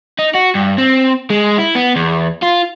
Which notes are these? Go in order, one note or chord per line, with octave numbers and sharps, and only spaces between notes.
D#4
F#4
G2
C4
G#3
E4
B3
E2
F4